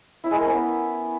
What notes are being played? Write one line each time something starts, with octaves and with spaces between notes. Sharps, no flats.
E4
G#3
A#4
C#4
B3